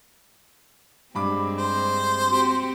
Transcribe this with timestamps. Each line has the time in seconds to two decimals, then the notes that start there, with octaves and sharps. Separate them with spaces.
1.15 G2 G#3 C4 B5 D6
1.58 C5
2.30 C4 F#4 G4